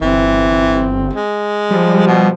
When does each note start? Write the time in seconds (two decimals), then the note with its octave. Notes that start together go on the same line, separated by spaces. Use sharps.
0.01 G1 E3 C4
1.14 G#3
1.71 F3 G3
2.07 B2